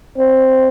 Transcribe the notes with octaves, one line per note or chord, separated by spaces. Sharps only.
C4